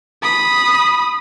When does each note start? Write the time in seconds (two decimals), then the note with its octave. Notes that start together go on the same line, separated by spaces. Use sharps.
0.22 B5 D#6